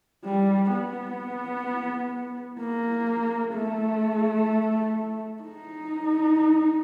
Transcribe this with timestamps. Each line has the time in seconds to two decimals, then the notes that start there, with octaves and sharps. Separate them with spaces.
0.24 G3
0.71 B3
2.60 A#3
3.54 A3
5.42 D#4